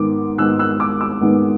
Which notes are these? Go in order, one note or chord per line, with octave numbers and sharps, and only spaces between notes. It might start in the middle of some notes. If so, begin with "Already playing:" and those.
Already playing: G#2 D#3 G#3 B3 D6
G#2 D#3 G#3 B3 E6 F#6
E6 F#6
D6 E6
D6 E6
G#2 D#3 G#3 B3